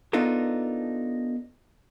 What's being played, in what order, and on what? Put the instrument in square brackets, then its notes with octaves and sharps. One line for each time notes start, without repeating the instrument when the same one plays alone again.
[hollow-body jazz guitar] B3 D4 D#4 F4 A4 A#4